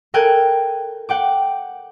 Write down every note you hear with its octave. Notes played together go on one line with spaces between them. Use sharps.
A4 A#4 G5 G#5 F#6 G#6
F#5 G5 D6